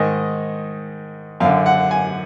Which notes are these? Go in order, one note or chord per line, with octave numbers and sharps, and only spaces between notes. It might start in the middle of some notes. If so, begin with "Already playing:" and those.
Already playing: G#2 D#3 D#5
F#2 D3 F5
F#5
G#5